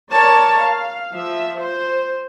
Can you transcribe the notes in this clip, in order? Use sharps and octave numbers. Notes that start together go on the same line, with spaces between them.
A#4 C#5 D5 A5
F5
F3 E5
C5